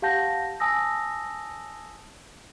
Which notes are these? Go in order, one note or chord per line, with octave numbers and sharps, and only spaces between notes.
G4 F5 F#5 A5 G6 A#6
G#5 A5 D#6 E6 A#6